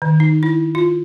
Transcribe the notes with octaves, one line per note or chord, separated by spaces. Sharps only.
D#3
D#4
E4
F4